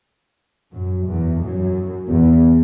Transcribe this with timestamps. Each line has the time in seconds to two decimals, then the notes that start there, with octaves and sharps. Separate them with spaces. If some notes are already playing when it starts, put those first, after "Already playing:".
0.74 F#2
1.07 E2
1.42 F#2
2.11 E2